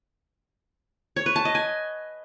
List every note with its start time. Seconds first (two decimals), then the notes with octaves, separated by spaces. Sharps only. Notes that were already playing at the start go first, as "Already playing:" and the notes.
1.16 C#5
1.26 B4
1.36 A5
1.45 D#5
1.55 G#5